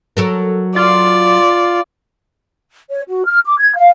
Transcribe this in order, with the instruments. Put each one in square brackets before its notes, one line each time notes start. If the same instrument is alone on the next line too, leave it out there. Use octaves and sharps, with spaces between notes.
[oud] F#3 A4 A#4
[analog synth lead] F4 [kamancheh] D5
[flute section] C#5
F#4
F6
D6
G#6
F5